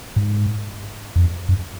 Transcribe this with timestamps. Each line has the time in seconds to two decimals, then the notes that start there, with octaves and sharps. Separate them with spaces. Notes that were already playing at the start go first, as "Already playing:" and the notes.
0.16 G#2
1.16 F2
1.49 F#2